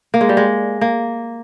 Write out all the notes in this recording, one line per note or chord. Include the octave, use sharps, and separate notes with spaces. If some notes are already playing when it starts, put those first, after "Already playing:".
A#3
G#3
G3
G#3
A#3